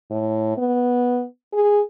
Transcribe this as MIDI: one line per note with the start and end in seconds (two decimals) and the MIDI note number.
0.10 0.54 45
0.57 1.24 59
1.53 1.80 68